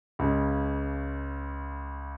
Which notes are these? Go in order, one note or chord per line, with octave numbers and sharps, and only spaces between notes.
C#2 C#3